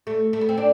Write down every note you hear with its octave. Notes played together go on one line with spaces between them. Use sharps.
A3
A3
B3
C4
D4